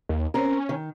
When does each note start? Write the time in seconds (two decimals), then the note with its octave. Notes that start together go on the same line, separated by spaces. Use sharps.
0.09 D#2
0.34 C4 C#4 A#4
0.69 D#3